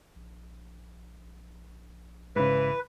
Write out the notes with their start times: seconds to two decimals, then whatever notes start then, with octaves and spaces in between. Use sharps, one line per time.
0.15 A#1
2.36 G#2 C#3 E3 B4